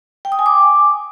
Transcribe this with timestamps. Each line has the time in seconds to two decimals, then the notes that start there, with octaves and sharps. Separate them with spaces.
0.25 G5
0.32 D#6
0.39 G#5
0.46 D6